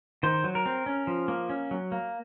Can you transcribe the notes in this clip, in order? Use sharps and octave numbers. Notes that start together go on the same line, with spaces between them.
D#3 C5
F#3
A#4
C4
C#4
F3
A#3
C#4
F#3
A#3